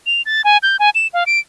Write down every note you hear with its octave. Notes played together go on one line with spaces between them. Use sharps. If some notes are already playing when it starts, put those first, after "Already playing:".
F7
A6
G#5
G6
G#5
E7
F5
D7